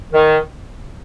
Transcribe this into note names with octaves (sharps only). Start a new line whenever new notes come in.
D#3